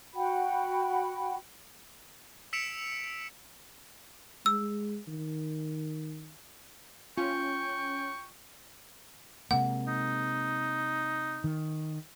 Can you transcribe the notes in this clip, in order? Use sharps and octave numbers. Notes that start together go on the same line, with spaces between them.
F#4 F#5 G5 B5
E6 B6 C#7 D7 E7 F7
G#3 E6
D#3
C#4 F4 G5 C#6
C3 G#3 A#3 F#5
D#4
D#3